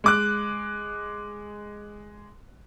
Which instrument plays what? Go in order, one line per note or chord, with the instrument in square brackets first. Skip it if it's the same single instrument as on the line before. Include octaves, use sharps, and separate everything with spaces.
[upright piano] G#3 D6 F#6